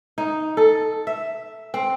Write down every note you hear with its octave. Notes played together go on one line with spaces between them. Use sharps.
D#4
A4
E5
C4